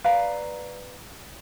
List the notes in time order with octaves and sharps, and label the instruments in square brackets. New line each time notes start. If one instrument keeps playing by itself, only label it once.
[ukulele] B4 D5 F5 A#5